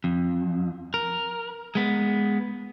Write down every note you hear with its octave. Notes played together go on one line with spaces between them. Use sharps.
F2
A#4
G#3 B3